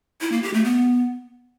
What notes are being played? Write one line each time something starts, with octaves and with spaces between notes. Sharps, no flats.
E4
A#3
G4
A3
B3